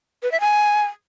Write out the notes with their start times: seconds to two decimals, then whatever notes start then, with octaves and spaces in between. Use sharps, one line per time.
0.23 B4
0.32 E5
0.40 G#5